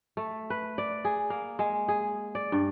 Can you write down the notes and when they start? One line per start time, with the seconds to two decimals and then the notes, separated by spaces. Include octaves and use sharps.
0.17 A3
0.50 B4
0.78 D5
1.05 G#4
1.30 A#3
1.59 G#3
1.88 G#4
2.35 D5
2.52 G2